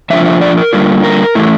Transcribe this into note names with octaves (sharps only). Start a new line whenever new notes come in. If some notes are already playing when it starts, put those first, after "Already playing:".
F3 A3 D4 F4 E5
E5
D5
A#4
D3 G3 A#3 F4
A#4
E3 A3 E4